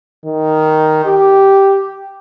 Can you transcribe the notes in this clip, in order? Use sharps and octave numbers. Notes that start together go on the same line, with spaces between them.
D#3
G4